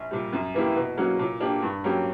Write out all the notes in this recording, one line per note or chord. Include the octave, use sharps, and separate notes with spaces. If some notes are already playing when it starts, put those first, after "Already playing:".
Already playing: A#1
A#2 G3
F#2
E3 A#3 E4 G4
B2
F#3 A#3 C#4 F#4
A#2
A#3 D4 G4
G2
F#3 A#3 C#4 G4